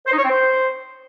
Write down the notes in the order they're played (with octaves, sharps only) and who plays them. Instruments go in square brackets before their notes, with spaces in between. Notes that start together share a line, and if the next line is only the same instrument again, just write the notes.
[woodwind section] C5
D#4
C#5
C4
C5